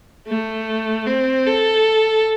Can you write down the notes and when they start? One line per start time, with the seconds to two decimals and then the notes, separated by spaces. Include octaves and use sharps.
0.28 A3
1.07 C4
1.47 A4